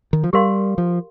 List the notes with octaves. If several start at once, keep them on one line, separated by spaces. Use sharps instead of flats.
D#3
F3
G3 G4 A#4 F5 C6
F3